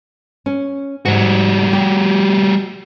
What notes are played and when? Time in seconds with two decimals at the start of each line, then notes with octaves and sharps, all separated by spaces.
0.46 C#4
1.05 G#2 G3 F#4
1.73 G4